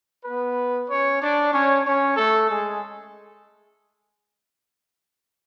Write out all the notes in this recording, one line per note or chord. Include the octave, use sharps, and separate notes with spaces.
B3 B4
C#4 C#5
D4 D5
C#4 C#5
C#4 C#5
A3 A4
G#3 G#4